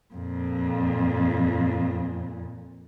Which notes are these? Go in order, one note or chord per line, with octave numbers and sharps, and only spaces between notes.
F2 A#2